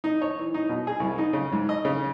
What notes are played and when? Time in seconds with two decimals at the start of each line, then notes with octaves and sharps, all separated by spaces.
0.04 D#4
0.22 C#5
0.39 E3
0.54 D#4
0.69 B2
0.87 G#4
1.00 C2
1.18 D#4
1.33 C#3
1.52 G#2
1.69 D#5
1.85 C#3